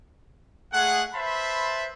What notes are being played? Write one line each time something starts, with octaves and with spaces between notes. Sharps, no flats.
G#3 A3 G#4 F#5
B4 C5 E5 A5 B5 C6